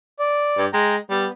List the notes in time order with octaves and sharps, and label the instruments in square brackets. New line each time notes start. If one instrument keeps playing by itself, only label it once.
[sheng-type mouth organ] D5
[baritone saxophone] G2
[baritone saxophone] G#3 [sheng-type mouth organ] G5 A#5
[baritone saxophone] G3 [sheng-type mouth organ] B3